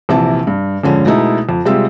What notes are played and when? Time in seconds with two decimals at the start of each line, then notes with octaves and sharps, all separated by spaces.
0.09 A#1 C3 E3 A5
0.47 G2
0.84 F2 G#2 D3 F3 C#4
1.06 B2 G#3 A3 D#4 E4
1.49 F2
1.66 C3 G3 G#3 F4 E6